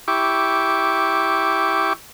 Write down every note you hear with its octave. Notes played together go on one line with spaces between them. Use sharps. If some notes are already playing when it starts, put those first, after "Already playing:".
E4 G4 C#6 D6